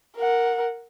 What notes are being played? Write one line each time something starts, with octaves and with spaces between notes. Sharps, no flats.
A#4 F#5